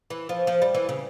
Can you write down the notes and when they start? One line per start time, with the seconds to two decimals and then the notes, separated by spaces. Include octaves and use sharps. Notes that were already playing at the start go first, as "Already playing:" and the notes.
0.10 E3
0.29 F3
0.47 F3
0.62 G3
0.74 E3
0.89 C#3